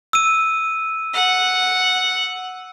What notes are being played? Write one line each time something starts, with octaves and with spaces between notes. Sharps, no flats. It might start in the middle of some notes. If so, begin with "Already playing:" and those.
E6 D#7
F#5